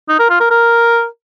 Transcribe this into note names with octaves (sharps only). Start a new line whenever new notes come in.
D#4
A#4
F4
A#4
A#4